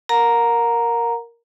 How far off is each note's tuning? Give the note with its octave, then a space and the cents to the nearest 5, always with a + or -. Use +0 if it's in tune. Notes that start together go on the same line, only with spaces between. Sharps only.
A#4 +0 F#5 -40 A#5 +0